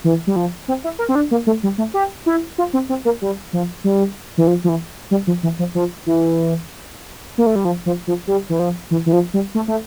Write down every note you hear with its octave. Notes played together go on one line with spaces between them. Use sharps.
E3
G3
F3
C4
E4
A#4
C4
D4
A#3
A3
G3
A3
G4
E4
F4
C4
C4
A#3
G3
F3
G3
E3
F3
F3
E3
G3
F3
E3
F3
F3
E3
A#3
A3
G3
F3
F3
F3
G3
E3
F3
E3
E3
F3
G3
A3
A3